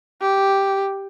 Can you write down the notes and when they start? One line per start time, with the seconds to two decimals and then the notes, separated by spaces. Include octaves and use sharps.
0.21 G4